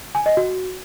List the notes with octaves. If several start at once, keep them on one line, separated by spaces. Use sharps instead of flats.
G#5
D#5
F#4